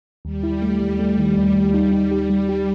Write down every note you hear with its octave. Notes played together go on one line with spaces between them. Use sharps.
D#2 G3
E4
A3
D#2
A3
D#3
D#2
D#2
D#4
D#4
G4
G3
G4